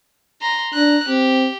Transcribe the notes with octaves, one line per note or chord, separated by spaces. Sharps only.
A#5 C6
D4 A#5 F#6
C4 G4